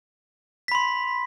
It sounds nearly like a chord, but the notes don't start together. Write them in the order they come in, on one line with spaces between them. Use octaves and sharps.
B6 B5 C6